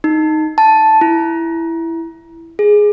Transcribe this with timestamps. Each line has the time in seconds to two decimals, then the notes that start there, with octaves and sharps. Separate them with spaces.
0.04 D#4
0.58 A5
1.01 E4
2.59 G#4